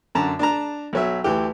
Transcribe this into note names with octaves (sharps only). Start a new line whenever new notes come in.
F#2 D3 A5 A#5
D4 A5 A#5
B1 F#3 E5
D2 E3 G4